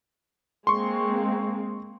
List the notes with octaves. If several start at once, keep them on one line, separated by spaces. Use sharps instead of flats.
G#3 A#3 C4 C6 C#6